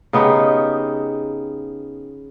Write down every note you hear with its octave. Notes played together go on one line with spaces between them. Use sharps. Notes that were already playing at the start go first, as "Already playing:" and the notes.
C#3 B3 D#4 G4